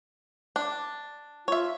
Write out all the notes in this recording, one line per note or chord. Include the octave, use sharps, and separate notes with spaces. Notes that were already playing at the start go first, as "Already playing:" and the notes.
D4
F4 C#5 E5